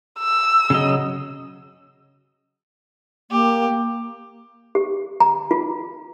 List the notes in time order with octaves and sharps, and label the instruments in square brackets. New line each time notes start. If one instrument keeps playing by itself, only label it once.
[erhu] E6
[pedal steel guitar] C#3 F#3 D#5
[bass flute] A#3 [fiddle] G4
[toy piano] G4
A#5
F4